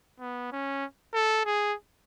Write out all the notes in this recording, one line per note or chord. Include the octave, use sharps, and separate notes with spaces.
B3
C#4
A4
G#4